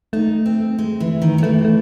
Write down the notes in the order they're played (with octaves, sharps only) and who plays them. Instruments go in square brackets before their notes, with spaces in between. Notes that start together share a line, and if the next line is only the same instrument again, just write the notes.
[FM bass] A3 [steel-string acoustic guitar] D#4
[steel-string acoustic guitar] C4
G#3
E3
D#3
F#3
[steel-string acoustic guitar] E3 [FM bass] A3
[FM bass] A3